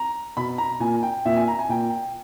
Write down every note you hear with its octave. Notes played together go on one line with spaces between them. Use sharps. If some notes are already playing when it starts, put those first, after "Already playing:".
Already playing: A#5
B2 B5
A#5
A#2 G#5
G5
A#2 E5
G#5
A#5
G#5
A#2 G5